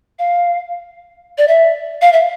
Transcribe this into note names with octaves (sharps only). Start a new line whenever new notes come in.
F5
D5
E5
F5
E5